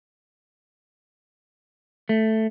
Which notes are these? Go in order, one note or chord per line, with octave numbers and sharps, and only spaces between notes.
A3